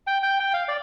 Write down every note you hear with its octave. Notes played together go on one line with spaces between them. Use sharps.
G5
G5
G5
F5
D5